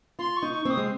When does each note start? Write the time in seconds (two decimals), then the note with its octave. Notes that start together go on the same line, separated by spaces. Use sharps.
0.19 F4 C6
0.37 C#6
0.42 D#4
0.53 C#6
0.65 C4
0.70 D#6
0.77 G#3